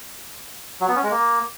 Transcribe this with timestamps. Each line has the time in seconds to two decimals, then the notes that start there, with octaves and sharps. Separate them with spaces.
0.81 F#3
0.88 B3
0.96 C#4
1.03 G#3
1.11 A#3